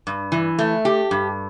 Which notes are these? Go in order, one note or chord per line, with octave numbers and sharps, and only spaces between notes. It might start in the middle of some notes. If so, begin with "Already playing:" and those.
G2
E3
A3
G4
G2